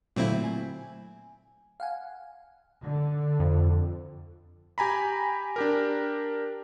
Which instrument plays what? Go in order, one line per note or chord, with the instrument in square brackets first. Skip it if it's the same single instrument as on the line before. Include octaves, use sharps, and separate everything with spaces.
[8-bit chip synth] A#2 C4 E4 [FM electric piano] D3 F#3 A3
[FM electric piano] G#5
F5 F#5 G#5
[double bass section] D3
[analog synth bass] F2
[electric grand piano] G4 G#5 A#5 B5
D4 G4 A#4